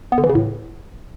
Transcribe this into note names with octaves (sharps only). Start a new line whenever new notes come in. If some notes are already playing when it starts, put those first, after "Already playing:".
B3
D3
E3
C#3
A2